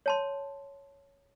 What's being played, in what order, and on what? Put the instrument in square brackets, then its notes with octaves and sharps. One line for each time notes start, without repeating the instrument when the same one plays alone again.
[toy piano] C#5 A5 C6